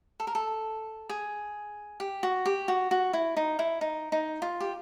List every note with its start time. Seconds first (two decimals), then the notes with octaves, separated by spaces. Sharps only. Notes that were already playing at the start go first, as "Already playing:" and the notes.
0.20 A4
0.27 A#4
0.35 A4
1.09 G#4
2.00 G4
2.23 F#4
2.46 G4
2.68 F#4
2.91 F#4
3.13 E4
3.37 D#4
3.59 E4
3.81 D#4
4.12 D#4
4.42 F4
4.60 G4